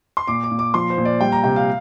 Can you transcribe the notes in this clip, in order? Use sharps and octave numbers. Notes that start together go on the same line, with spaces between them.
C6
A#2 D6
D6
A#2
D6
F3 C6
C5
A#2
D5
G3 G5
A#5
C3 G5
F5